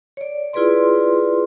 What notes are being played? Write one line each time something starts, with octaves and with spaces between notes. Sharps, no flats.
C#5 D5
E4 F4 G#4 B4 D5 C6